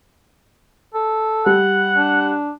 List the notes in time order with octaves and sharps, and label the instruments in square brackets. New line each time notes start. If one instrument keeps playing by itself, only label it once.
[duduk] A4
[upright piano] G3 [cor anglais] F#5
[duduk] D4